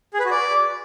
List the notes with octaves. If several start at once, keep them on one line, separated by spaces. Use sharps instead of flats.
G#4
B4
F#4
D5